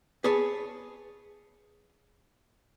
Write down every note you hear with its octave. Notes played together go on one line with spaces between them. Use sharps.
G#4 B4 C#5 A5